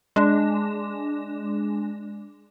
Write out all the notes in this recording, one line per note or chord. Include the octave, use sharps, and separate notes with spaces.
G#3 D4